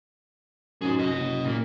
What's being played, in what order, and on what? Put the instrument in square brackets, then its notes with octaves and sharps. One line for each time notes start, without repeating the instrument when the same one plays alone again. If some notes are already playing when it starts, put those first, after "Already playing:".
[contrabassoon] F#2 [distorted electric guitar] D#4 G#4
[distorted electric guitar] B4 D#5
[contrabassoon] F#1
[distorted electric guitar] A#2 A#3